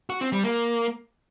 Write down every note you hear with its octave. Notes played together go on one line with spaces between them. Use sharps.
F#4
C4
G3
A#3